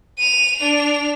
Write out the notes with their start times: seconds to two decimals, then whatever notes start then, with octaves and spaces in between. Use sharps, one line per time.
0.19 D#7 F7
0.57 D4 F7